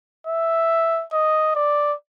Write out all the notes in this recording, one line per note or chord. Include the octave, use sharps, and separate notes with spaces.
E5
D#5
D5